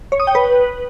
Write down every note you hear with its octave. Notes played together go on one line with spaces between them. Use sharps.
C#5
D#6
G5
B4